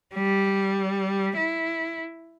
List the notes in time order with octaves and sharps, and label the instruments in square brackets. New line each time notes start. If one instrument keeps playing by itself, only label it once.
[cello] G3
E4